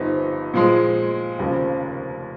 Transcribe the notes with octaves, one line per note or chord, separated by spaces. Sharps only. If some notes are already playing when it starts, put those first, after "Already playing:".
Already playing: G1 G2 F3 C4 D#4
A#2 F3 G#3
F1 D#2 C#3 F3 C4